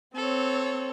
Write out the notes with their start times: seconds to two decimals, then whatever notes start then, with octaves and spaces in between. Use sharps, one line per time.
0.16 C4 A4 C#5